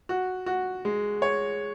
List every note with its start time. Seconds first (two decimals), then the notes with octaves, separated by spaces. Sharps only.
0.09 F#4
0.46 F#4
0.85 G#3
1.22 C#5